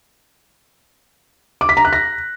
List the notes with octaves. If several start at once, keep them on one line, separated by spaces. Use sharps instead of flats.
D6
B6
A#5
F#6
A#6